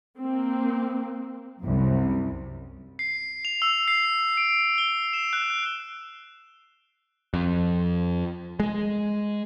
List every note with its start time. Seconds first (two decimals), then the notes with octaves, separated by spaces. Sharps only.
0.19 A#3 C4
1.62 C2 F#2
2.99 C7
3.45 F7
3.62 E6
3.88 C7
4.37 D7
4.78 G7
5.13 E7
5.33 F#6
7.34 F2
8.60 G#3